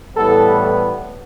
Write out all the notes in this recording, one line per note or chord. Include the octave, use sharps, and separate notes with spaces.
A2 E3 G3 B3 A4